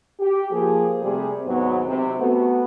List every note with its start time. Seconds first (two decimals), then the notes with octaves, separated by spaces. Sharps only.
0.20 G4
0.51 F3 A#3 G#4
1.01 C3 G3 A3 G4 G#4
1.47 D#2 G#2 F#3 B3
1.87 C3
2.18 A3 B3 F#4